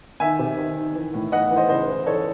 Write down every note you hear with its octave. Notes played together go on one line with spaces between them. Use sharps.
D#3 E5 G#5
C3
D#3
D#3
E3
A2
E3 D#5 F#5
E3
C5 D#5
C#3 C5 D#5
E3
E3 A4 C#5